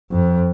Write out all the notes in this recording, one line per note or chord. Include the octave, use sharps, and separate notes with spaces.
F2